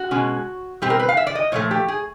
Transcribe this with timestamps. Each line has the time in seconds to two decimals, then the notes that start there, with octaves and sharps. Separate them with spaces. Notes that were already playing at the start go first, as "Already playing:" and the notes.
Already playing: F#4
0.11 B2 G#3 C#4
0.82 B2 G3 C4 G4
0.90 A#4
1.00 B4
1.09 F5
1.17 E5
1.27 D5
1.35 D#5
1.52 A#2 F3 A3 C#5
1.71 G4
1.88 G#4